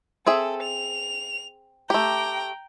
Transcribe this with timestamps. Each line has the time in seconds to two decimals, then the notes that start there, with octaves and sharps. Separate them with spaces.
0.27 C4 G#4 A4 E5
0.62 F7
1.90 A3 G4 G5 A#5